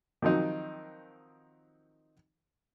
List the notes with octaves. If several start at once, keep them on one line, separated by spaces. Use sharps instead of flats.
D#3 F3 F#3 C4 D#4